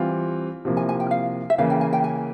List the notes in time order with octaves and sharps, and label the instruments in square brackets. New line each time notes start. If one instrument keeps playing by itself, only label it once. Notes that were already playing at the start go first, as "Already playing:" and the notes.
Already playing: [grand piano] E3 G3 C4 F4
C3 F3 A#3 E4
[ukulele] G#5
G#5
G5
F5
E5
[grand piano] C#3 E3 A#3 [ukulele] F5
[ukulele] G5
G#5
G5
G#5